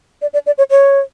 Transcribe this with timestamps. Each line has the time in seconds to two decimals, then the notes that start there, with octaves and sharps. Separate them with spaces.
0.22 D5
0.33 D5
0.46 D5
0.58 C#5
0.71 C#5